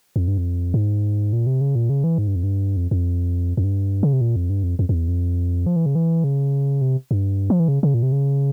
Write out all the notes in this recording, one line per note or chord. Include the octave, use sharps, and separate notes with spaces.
F2
G2
F2
G#2
A#2
C3
C#3
A#2
C#3
E3
G#2
G2
F2
G2
F2
F2
F2
G2
C#3
C3
A#2
F2
G2
F2
F2
F2
E2
F2
F3
E3
C#3
E3
C#3
C3
G2
F3
E3
C#3
C#3
A#2
C3
C#3